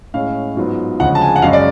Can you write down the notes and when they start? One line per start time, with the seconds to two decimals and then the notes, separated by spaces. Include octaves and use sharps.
0.14 A2 G#3 C#4 F5
0.57 G#2 F#3 B3 F4
1.00 D2 C#3 F3 G#3 F#5
1.15 A5
1.22 G#5
1.36 F#5
1.42 F#2 C#3 G#3 C#4 F5
1.53 D5